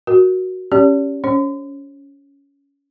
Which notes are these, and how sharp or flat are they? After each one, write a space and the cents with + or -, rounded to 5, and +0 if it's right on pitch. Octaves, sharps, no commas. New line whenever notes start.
F#4 +0 A#4 +20
C#4 +0 G4 +0 D5 -45
C#4 +20 C#5 -45